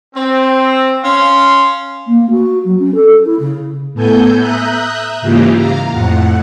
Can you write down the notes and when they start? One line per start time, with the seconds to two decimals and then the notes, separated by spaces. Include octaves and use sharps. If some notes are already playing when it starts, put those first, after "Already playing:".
0.15 C4
1.03 C#4 F5 C6
2.07 A#3
2.30 F#4
2.64 F#3
2.79 C#4
2.95 A4
3.25 E4
3.39 C#3
3.94 A2 B3 A4 G#5 G6
4.38 E5 A#5 D#6 F#6 G6
5.21 G#2 C#3 E3 A#3 F4 G4
5.54 F5 A#5
5.91 F2 A2 F#5